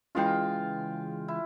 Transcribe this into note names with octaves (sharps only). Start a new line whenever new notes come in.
C#3 E3 G#3 F4 F5 G5
E4